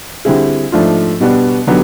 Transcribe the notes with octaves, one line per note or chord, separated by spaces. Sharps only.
D3 G3 C4 E4 G#4
G#2 F3 A3 D4 F4
B2 G3 B3 D4
D3 F#3 B3 D#4 G4